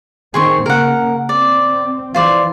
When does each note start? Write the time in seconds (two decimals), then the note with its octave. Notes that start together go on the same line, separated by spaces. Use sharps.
0.34 D#3 C4 G#4 C6 C#6
0.66 C#3 A#3 A#4 F#5
1.29 C4 D5
2.14 E3 F4 C5 D5